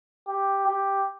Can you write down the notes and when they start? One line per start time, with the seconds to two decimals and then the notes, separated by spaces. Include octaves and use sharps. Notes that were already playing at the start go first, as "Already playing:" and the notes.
0.28 G4
0.67 G4